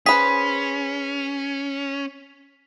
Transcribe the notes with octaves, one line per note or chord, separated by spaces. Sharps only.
C#4 G#4 B4 C5 B6